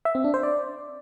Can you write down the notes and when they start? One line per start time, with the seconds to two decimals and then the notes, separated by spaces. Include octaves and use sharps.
0.05 E5
0.15 C4
0.24 D4
0.34 C5
0.43 D5